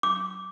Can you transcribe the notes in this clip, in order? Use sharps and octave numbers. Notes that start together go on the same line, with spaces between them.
D6